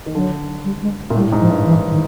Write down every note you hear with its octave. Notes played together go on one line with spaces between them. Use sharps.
D#3
D3 F#3
G3
G#3
A#2
A2 G3
G#2
F3
G2
E3
D#3